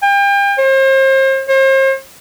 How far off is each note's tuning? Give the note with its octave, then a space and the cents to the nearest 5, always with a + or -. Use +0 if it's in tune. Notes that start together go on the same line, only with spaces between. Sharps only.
G5 +35
C5 +40
C5 +40